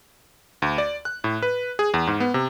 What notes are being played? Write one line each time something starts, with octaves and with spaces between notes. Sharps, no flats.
D2
D5
F#6
A2
B4
G#4
E2
G#2
B3
C3